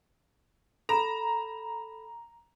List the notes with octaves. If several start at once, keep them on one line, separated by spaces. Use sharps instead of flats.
A4 A#5 B5 E7